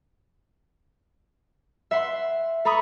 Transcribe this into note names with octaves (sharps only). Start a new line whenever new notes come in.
E5 F#5 C6
A4 A#5 B5 C#6 D#6